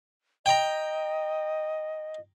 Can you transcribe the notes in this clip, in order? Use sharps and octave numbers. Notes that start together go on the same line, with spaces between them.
D#5 G5 A#5